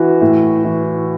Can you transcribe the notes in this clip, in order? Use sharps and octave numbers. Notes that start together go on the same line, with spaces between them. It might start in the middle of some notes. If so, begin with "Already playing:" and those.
Already playing: E3 F#4
A2
E3